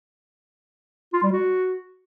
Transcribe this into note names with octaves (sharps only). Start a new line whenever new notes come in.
F4
G3
F#4